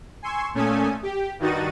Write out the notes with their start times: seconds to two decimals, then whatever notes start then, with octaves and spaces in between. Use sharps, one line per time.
0.22 G#5 C6 C#6 E6
0.54 A#2 A3 C#4 A4 G#5 D#6
1.03 G4
1.39 G2 D#3 D#4 F#4 A6 D#7